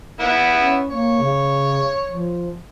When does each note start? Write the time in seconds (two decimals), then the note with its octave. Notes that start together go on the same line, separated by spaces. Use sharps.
0.20 B3 E4
0.59 C#4
0.90 A#3 C#5
1.19 C#3
2.07 F3